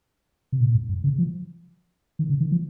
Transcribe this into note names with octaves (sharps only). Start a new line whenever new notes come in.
C3
A#2
G#2
G2
C#3
F3
D#3
C#3
D#3
F3